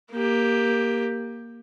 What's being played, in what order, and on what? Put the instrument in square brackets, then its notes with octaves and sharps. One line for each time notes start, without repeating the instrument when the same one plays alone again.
[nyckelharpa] A#3 G4